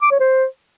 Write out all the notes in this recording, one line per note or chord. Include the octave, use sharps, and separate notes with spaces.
D6
C#5
C5